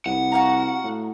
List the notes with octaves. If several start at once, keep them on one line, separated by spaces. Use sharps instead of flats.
C2 F#5
F#4 F5 A#5
A2